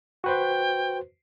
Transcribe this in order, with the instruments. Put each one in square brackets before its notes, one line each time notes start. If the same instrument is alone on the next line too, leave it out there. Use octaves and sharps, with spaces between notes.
[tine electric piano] F#4 B4 C5 [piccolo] G5